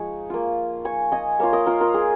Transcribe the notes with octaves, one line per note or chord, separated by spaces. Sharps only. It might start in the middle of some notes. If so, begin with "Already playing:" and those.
Already playing: F3 G#3 D#4 D#5 G#5 C#6
A#3 F4
G#5 C#6
D#5 G#5
A#3 F4 C#5 F5
A#4 D#5
F4 A#4
F4 A#4
G#4